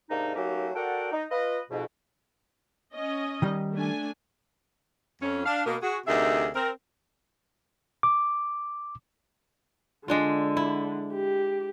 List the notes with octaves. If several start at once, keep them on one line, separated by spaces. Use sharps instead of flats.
G#2 C3 A#3 D4 D#4
F#3 A3 A#3 C#4 D#4 G4
F#4 A4 A#4 D5 F#5 G5
D#4
F4 B4 D#5
F2 G#2 B2
C#4 D#5
D#3 G3
A3 D4 G#5
F2 C#4
D4 F5
B2 A#3 B3
F#4 G#4
D2 C3 D#4 G#4 A#4 E5
C4 A#4
D6
D3 G#3 D4 F4
E4
G4